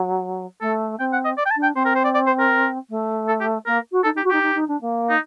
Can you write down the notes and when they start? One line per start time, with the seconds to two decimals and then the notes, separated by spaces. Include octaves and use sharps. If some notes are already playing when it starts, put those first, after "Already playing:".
Already playing: F#3
0.61 A3 A4
0.99 C4 G5
1.13 F#5
1.25 D#5
1.38 D5
1.46 G5
1.51 A5
1.56 D4
1.63 G5
1.75 C4 C5
1.85 A#4
1.95 C5
2.04 D5
2.14 D5
2.27 C5
2.39 A#4
2.90 A3
3.28 A4
3.41 G4
3.66 A#3 A#4
3.92 F#4
4.04 D#4 A4
4.14 D#4 G4
4.24 F#4
4.30 D#4 G4
4.43 D#4
4.55 D#4
4.68 D4
4.81 A#3
5.10 D#4